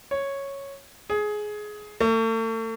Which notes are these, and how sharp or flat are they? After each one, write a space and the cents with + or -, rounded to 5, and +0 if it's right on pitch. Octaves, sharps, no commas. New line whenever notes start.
C#5 -5
G#4 +15
A3 +40